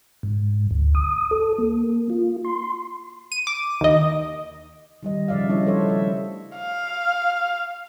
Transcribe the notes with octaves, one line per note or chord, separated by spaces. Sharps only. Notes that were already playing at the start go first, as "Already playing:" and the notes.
G#2
D2
D#6
A4
A#3
F4
C6
D#7
D6
D#2 D#5
D#3 G3 D#5
C#3 F3 D5 E5 F5
G3 D4 E4 C#5 D#5
F3 A3 A4 C5 C#5 E5
E5
F5